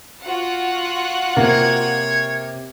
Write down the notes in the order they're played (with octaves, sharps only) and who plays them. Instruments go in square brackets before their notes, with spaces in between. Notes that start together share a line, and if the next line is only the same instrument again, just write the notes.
[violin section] F4 F#4 F#5
[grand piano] C3 [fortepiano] A#3 [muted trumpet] C#5